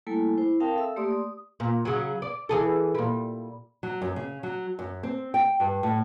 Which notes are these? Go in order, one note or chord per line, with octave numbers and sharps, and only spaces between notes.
G3 A3 A#3 E4 A4 G#5
E4 C5
C4 A#4 F5 G5 A5 D#6
A4 E5 E6
A3 A#3 G4 D5 C6 D#6
D#6
A#2
C#3 F#3
D5
E3 G#4 A4
A#2 G3
F#3
F#2
C#3
F#3
F#2
C4
G5
G2
A2